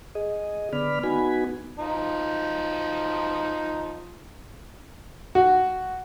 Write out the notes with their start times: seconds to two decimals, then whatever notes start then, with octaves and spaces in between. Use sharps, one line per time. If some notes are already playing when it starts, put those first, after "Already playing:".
0.15 G#4 D#5
0.73 D3 B3 D5 B5 F6
1.03 B3 D#4 F#4 G#5 B5
1.79 F3 D#4
5.35 F#4